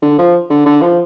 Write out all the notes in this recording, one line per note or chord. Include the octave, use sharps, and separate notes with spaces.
D3
F3
D3
D3
F3